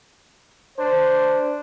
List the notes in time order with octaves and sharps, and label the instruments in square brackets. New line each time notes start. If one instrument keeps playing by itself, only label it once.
[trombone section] D4 C5